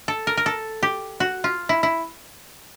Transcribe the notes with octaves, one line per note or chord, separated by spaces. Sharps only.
A4
A#4
A#4
A4
G4
F#4
F4
E4
E4